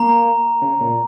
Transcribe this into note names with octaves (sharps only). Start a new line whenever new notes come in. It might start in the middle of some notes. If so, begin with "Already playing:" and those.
Already playing: A#3 A#5
C#3
A#2